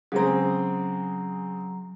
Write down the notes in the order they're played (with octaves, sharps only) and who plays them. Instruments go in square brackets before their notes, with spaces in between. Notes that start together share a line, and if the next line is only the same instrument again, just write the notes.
[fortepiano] C#3 G#3 C4 [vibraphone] F#3 A#5